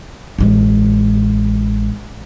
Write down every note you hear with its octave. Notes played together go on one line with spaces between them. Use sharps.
A1 G#3